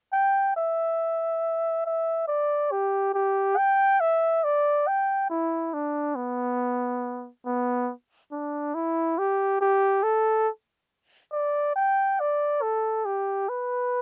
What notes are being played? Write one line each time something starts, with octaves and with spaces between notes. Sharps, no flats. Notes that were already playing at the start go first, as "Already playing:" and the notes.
G5
E5
E5
D5
G4
G4
G5
E5
D5
G5
E4
D4
B3
B3
D4
E4
G4
G4
A4
D5
G5
D5
A4
G4
B4